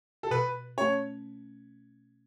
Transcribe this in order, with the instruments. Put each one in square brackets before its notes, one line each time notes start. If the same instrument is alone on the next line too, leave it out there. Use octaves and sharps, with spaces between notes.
[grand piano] A4
[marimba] B2 [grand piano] B4
[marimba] A3 C#4 [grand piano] C#5